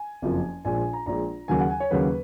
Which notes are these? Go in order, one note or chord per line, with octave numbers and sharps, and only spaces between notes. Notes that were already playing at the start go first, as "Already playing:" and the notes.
Already playing: G#5
F#1 F2 F3 A#3
A#1 A#2 G#3 G#5
G#5
A#5
A#1 A#2 G#3 A#5
D#2 C#3 F#3 A#3 G#5
F#5
G#5
C#5
D#2 C#3 F#3 A#3 B4